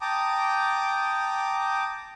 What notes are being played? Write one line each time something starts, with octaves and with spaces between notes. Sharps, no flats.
G5 A5 A#5 D6 D#6